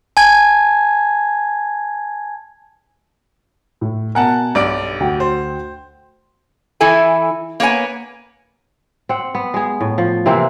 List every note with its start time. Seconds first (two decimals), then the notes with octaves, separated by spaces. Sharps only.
0.17 G#5 A5 G#6
3.81 A2
4.15 B2 A#4 F#5 G#5 A5
4.55 B1 G2 D5 D7
5.00 D2 F#4 G5
5.20 C5
6.81 E3 E4 A4 G#5
7.60 A#3 B3 C#5 G#5
9.09 C4 F#5
9.35 B3
9.54 G#3 G#4
9.81 A2
9.98 F3
10.26 C3 E3 A#3 C4